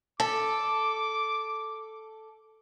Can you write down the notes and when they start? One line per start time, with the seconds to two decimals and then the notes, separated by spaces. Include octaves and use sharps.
0.20 A4 D6